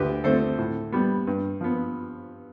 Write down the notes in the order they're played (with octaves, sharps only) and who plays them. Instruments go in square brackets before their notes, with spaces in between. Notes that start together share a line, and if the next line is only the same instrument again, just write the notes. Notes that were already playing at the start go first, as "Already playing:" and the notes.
Already playing: [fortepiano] D2 G4 B4
D3 A3 C4 A4 C5
A2
G3 B3
G2
F3 B3